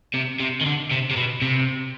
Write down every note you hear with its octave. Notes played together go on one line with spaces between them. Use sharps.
C3
C3
D#3
D3
C3
C3
B2
C3